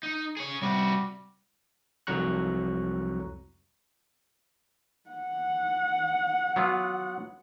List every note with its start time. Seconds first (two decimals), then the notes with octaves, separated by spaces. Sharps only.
0.03 D#4
0.37 G#4 C#5
0.62 C3 G3 F#4
2.07 C2 F2 F#3 A#5 C#6 F#6
5.10 F#5
6.56 F#3 B3 F4